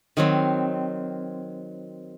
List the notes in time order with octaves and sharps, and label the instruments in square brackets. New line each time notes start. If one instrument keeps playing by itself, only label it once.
[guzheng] D#3 F#3 C4